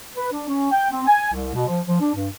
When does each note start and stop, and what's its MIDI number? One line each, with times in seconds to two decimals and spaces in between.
0.16 0.32 71
0.32 0.45 62
0.49 0.67 61
0.71 0.86 79
0.91 1.01 60
1.07 1.31 80
1.33 1.52 36
1.54 1.65 47
1.67 1.79 53
1.87 1.99 53
2.01 2.11 62
2.15 2.28 43